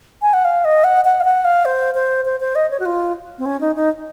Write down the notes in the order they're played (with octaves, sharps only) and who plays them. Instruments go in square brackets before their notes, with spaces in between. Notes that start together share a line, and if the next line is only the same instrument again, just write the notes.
[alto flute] G#5
F#5
F5
D#5
F#5
F#5
F5
F#5
F5
C5
C5
C5
C5
D#5
C#5
F#4
F4
C4
C#4
D#4
D#4